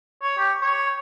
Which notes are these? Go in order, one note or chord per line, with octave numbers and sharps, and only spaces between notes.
C#5
G4
C#5